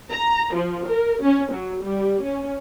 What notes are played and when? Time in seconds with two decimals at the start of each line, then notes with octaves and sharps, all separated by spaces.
0.11 A#5
0.55 F3
0.87 A#4
1.22 C#4
1.53 F#3
1.83 G3
2.24 C#4